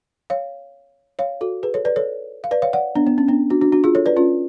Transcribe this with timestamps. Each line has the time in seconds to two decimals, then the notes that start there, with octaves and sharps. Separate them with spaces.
0.30 C#5 F5
1.19 C#5 F5
1.41 F#4 A4
1.63 G#4 B4
1.74 A4 C#5
1.85 B4 D5
1.96 A4 C#5
2.44 F5
2.51 B4 D5
2.62 C#5 F5
2.73 D5 F#5
2.95 B3 D4
3.07 B3
3.18 C#4
3.28 B3 D4
3.50 D4 F#4
3.61 D4 F#4
3.72 D4 F#4
3.84 F4 G#4
3.95 A4 C#5
4.06 B4 D5
4.16 C#4 F4